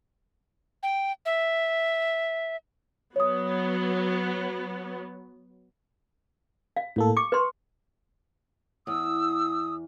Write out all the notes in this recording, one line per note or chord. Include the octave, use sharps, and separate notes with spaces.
G5
E5
F#3 B3 C#5 D#6
F5
A2 A#3 A4
C#6 D6
B4 C6
E2 D#6 E6